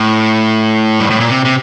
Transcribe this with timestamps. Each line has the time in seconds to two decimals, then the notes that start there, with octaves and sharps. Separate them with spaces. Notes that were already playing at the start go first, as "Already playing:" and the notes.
Already playing: A2
1.00 G2
1.10 A2
1.20 A#2
1.30 C3
1.45 C3